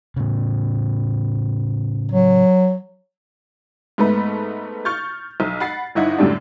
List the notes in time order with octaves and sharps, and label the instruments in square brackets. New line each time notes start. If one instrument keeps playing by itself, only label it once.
[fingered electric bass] A2 C#3
[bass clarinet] F#3
[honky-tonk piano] G#2 A3 B3 B5
C#6 F6 G6 A6
B1
F#5 B5 A6 C7
G1 D#4 E4 F#5
F#2 A2 D3 G3 D4